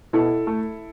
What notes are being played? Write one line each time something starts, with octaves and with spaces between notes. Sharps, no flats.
B2 E4 A4
A3